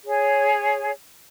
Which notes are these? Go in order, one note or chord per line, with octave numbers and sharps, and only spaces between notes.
G#4 C#5